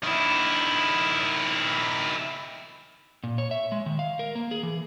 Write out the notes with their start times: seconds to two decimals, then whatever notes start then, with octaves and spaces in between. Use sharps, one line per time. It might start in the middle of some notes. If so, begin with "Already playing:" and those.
0.03 D#3 E4
3.24 A#2
3.38 C#5
3.51 E5
3.72 G#3
3.86 D#3
3.99 F5
4.19 A#4
4.35 A#3
4.51 G#4
4.63 E3